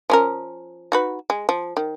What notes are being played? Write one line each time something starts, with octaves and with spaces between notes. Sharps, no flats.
F3 C#4 A#4
D#4 F#4 B4
G#3
F3
D#3